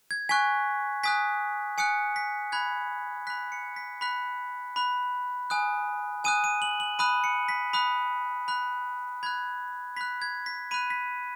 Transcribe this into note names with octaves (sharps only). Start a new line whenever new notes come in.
G#6
G#5 C#6 F#6 B6
G#5 D#6 F#6 B6
G#5 D#6 F#6 C#7
B6
B5 F#6 G#6
B5 F#6 B6
C#7
B6
B5 F#6 B6
B5 F#6
G#5 D#6 F#6
G#5 D#6 F#6 D#7
D#7
F#7
F#7
B5 D#6 F#6 D#7
C#7
B6
B5 D#6 F#6
B5 F#6
B5 F#6 G#6
B5 F#6 B6
G#6
B6
B5 F#6 D#7
B6